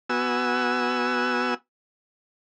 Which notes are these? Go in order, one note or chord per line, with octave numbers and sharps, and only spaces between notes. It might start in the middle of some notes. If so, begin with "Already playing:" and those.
B3 F#4 G#5 E6